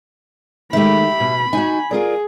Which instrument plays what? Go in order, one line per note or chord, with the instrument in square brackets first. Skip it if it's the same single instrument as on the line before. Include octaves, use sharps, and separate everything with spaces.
[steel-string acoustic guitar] D#3 G#3 A3 [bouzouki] E4 G4 [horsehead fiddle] B5
[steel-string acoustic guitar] B2
[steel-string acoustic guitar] D#4 F#4 [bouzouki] G#5
[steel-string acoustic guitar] F4 A#4 D5 [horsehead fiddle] G#4